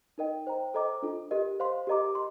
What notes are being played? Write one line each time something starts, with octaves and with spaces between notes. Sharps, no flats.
D#4 A#4 D#5 G5
C5 G5 A#5
A4 C5 D#5 A#5 D6
D4 F4 A4
G4 A#4 D#5
C5 F5 C6
G4 A#4 D#5 A#5 D6
C6